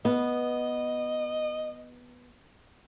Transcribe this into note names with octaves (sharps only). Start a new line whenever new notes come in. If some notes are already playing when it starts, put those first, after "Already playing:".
B3 D#5